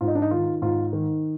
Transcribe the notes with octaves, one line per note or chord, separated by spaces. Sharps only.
G#2 F4
D#4
D4
D#4
D#3 F4
G#2 F4
D#3